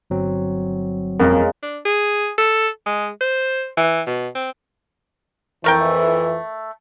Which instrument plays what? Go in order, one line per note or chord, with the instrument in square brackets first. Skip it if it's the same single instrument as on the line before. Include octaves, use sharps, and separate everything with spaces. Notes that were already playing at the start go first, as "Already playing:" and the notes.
[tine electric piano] G1 F#3 C4
[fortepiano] F2 [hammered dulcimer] C#3 G#3 A#3 [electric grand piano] A#4
[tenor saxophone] D4
G#4
A4
G#3
C5
E3
B2
C4
[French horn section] F2 E3 [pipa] A3 A#4 G5